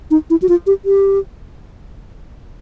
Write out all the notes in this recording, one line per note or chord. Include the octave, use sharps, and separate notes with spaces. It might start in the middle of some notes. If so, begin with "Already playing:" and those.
D#4
E4
F#4
F4
G4
G4